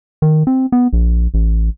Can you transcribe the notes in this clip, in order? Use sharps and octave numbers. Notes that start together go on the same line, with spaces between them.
D#3
C4
B3
A#1
A1